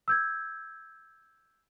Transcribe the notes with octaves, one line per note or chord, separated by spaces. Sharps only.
E6 G6 G#6